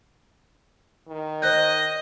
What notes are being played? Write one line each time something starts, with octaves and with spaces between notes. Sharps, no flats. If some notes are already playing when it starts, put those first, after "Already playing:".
D#3
C5 D#5 F#6 G6